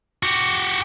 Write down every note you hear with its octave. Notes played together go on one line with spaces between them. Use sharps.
F#4 G4